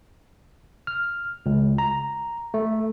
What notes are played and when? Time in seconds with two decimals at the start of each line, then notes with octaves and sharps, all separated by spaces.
0.87 F6
1.46 C#2
1.78 A#5
2.54 A3